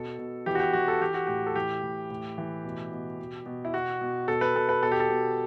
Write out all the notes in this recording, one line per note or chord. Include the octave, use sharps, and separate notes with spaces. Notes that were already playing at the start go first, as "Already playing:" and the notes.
Already playing: B2 A4
B2
E3 G4
F#4
G4
E3 F#4
A4
E3 G4
F#4
A2 G4
A4
E3 G4
A2
A2
E3
B2
B2
B2
B2
E4
B2 F#4
B2
B2 A4
B4
B2 A4
B4
B2 A4
G4
A4
B2